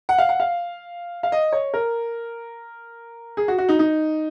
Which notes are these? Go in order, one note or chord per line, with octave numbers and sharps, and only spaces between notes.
F#5
F5
F#5
F5
F5
D#5
C#5
A#4
G#4
F#4
F#4
D#4
D#4